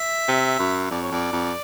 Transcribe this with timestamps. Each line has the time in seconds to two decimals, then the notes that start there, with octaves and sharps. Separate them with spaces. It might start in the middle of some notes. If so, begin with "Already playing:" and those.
Already playing: E5
0.28 C3
0.59 F#2
0.90 F2 D5
1.02 C#5
1.12 F2 D5
1.33 F2